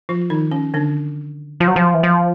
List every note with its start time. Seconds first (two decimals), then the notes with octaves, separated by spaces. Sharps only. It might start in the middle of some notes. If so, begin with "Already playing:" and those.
0.09 F3 F4
0.30 D#3 D#4
0.52 C#4
0.74 D3 D4
1.60 F3
1.67 F#3
1.76 F3
1.94 E3
2.03 F3